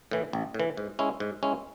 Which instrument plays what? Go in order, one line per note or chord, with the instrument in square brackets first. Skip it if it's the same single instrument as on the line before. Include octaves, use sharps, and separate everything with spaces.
[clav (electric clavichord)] A2 E3
A1
A2
E3
G#2
G#3 C#4 E4
G#2
G#3 C#4 E4